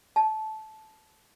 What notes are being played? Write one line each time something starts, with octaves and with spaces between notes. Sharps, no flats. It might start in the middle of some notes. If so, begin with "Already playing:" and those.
A5